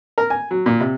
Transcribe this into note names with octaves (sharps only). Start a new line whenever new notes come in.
A#4
G#5
F#3
A#2
C3